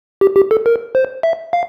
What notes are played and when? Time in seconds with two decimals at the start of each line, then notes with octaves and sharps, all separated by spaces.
0.21 G4
0.36 G4
0.51 A4
0.66 A#4
0.95 C5
1.23 E5
1.53 F5